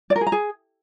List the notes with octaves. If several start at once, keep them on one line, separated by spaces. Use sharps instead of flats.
D5
A#4
G#4
A#5
G#4